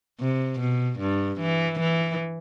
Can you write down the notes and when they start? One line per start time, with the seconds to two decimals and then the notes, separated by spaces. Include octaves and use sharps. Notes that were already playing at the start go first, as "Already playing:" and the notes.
0.20 C3
0.60 B2
0.99 G2
1.40 E3
1.80 E3